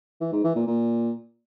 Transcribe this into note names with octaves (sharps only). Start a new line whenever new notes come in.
E3
G#2
E3
A#2
A#2